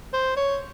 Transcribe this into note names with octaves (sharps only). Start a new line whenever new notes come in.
C5
C#5